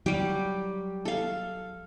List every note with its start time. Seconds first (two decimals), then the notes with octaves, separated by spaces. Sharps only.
0.06 F#3 G3 G4
1.05 A4 F5